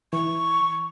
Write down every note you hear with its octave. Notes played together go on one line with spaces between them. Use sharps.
E3 C#6